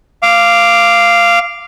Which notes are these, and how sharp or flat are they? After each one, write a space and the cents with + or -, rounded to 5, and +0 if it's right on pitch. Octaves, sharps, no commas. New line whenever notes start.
F5 -10 D6 +0